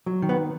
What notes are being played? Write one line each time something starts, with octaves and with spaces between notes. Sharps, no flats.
F#3
D#3
B3